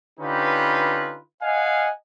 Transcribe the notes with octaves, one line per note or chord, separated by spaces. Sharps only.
D3 C#4 D#4 F4 G4 B4
D#5 F5 F#5 G#5